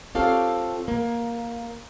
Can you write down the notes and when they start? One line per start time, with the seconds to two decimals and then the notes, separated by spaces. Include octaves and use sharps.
0.15 C4 F4 G4 A4 C#5 F5
0.88 A#3